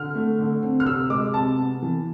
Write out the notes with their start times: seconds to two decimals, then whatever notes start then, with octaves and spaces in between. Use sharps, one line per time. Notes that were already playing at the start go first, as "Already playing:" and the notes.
Already playing: D3 F6
0.15 A3
0.39 D3
0.63 C4
0.80 F6
0.86 C3 E6
1.10 G#3 D6
1.34 C3 A5
1.58 B3
1.82 E3